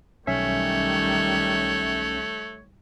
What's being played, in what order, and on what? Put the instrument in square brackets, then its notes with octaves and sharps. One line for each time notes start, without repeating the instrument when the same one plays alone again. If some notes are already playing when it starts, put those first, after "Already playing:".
[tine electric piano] B1 C#4 E5 [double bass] D#3 G3 [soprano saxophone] A3 [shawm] C#5